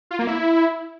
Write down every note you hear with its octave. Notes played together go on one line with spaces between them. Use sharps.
F4
A#3
E4